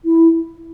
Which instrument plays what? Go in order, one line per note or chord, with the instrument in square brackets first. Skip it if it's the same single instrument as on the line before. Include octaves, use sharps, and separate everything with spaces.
[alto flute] E4